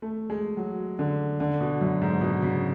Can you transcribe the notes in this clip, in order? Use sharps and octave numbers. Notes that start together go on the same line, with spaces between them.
A3
G#3
F#3
D3
D3
B2
F#2
G#2
B2
C#3